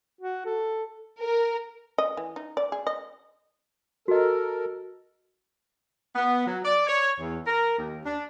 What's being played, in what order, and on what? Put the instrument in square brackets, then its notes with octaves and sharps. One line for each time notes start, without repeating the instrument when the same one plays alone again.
[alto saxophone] F#4
A4
[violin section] A#4
[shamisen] D#5
E3
D#4
D5
G#4
D#5
[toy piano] F#4 D#5 [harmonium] A4 A#4
[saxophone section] B3
F#3
D5
C#5
E2
A#4
D#2
D4